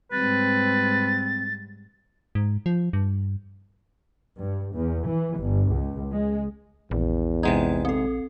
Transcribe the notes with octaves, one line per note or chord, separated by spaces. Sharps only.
G#2 G3 C4 B4 A6
G#2
F3
G2
G2
E2
E3
G1
C#2
G#3
A#1 E2
C3 G#3 D#4 F#5 G#6
C4 A4